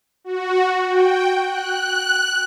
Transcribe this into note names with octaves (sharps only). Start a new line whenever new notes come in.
F#4
G5
F#6